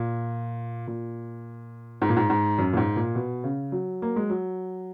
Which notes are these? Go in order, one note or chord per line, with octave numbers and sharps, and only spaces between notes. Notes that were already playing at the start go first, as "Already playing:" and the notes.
Already playing: A#2
A#2
G#2
A#2
G#2
G#2
F#2
A#2
G#2
A#2
B2
C#3
F#3
A#3
G#3
F#3